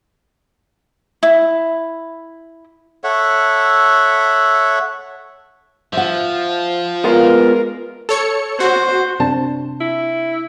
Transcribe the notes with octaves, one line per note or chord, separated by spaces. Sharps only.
E4
A4 C#5 E5 F#5
F3 E5 F#5
G#3 B3 F4 A#4
A4 C#5 C#7
F#4 C5
C3 C4 D4 A5
E4